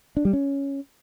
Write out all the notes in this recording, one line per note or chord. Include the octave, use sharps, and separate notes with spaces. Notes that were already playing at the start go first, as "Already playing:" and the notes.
D4
G3
C#4